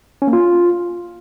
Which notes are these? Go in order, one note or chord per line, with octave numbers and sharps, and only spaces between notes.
C#4
A#3
F4